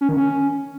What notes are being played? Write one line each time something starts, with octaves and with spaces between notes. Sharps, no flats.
C#4
D#3
C#4